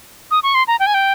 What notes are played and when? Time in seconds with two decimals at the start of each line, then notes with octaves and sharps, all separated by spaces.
0.31 D#6
0.43 C#6
0.55 C6
0.68 A#5
0.80 G5
0.87 G#5
0.94 G5